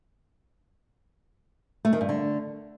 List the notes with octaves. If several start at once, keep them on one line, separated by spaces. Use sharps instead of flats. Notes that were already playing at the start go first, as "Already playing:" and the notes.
A3
D#3
G2
D3